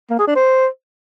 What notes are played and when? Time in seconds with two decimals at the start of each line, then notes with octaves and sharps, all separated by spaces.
0.10 A#3
0.19 G#4
0.27 D4
0.35 C5